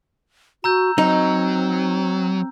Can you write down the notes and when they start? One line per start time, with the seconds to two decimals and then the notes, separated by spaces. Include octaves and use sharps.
0.64 F#4 A#5 E6 G6
0.98 F#3 C4 D#4